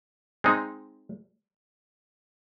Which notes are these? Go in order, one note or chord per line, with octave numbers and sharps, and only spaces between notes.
G#3 C4 D#4